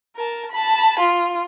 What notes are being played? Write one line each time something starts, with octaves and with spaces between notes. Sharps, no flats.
A#4 A5
A5 B5
F4